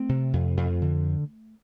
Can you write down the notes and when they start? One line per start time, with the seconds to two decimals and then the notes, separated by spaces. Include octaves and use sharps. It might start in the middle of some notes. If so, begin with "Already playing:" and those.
Already playing: A3 C4
0.09 C3
0.33 F2
0.57 F2
0.82 D3